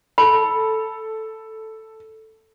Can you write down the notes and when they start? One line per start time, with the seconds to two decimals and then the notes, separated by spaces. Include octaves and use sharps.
0.18 A4 B5